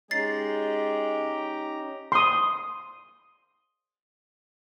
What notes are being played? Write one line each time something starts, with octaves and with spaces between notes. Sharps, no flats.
G#3 C#4 D#4 G4 A#5 A6 C7
C6 D#6